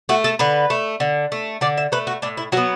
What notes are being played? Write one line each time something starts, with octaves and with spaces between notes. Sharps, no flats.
A3 F#4
A4
D3 B4
A3
D3
A3
D3 D5
E5
A3 B4
F#4
A2 D4
E4
F#3 B3 F#4